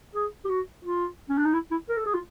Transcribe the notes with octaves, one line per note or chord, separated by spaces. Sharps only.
G#4
G4
F#4
F4
C#4
D4
D#4
E4
E4
A#4
A4
G#4
F4